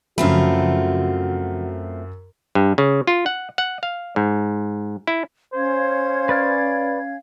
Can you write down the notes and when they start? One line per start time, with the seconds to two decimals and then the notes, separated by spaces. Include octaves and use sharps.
0.18 F#2 C#3 F3 A3 C4 F4 F#4 B5
2.55 G2
2.78 C#3
3.07 F4
3.26 F#5
3.58 F#5
3.83 F5
4.16 G#2
5.07 E4
5.54 C#4 C5 F5 G#6
6.29 B4 D5 F6